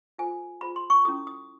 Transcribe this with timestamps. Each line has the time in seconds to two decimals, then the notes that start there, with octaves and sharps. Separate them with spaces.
0.18 F4 A4 C5 G#5
0.61 F4 G#4 C5 B5
0.76 C6
0.90 C#6
1.05 C#4 E4 A4 D#6
1.27 D#6